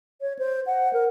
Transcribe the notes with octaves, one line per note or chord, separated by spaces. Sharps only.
C#5
C5
F#5
A#4